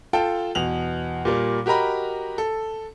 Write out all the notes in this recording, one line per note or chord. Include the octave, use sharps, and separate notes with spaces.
F4 A4 G5 A5
E2 B2 F7 F#7
A#2 G3 A#3
F#4 G4 A#4 D#5 A#5 B5
A4